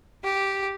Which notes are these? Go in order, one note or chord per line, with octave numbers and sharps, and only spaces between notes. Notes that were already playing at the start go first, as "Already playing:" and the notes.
G4